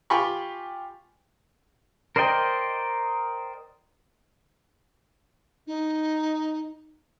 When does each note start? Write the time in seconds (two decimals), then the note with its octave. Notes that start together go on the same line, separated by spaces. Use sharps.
0.10 F4 G4 G5 G#5 B5 C#6
2.16 A#4 C5 D5 D#5 G5
5.67 D#4